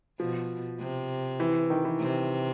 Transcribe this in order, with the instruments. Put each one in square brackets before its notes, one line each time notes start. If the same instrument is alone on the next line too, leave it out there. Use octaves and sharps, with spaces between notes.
[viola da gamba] B2 [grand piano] F3
[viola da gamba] C3
[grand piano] E3
D#3
E3
[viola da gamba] C3